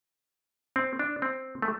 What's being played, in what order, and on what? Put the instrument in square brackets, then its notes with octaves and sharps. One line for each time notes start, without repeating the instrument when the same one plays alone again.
[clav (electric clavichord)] C4
D4
C4
A3